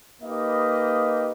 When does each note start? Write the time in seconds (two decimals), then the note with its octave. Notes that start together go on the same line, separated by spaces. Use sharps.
0.22 A#3 D#4 G4 B4 D#5